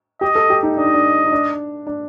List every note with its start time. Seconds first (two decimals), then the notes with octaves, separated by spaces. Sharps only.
0.21 G4 D#5
0.35 A4
0.50 G4
0.63 D#4
0.77 D4 D#5
0.85 D#4
0.94 D4
1.26 D#4
1.32 D4
1.87 D4